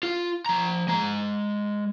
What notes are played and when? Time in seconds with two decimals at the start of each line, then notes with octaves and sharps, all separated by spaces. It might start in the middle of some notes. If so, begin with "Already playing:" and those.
0.03 F4
0.46 F3 A#5
0.88 G#3 A#5